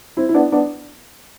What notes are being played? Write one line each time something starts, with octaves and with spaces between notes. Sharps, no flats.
C4 E4
E4
B3 D4
B3 D4